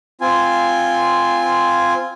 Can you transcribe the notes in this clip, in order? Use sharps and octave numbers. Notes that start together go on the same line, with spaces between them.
C4 F4 G#5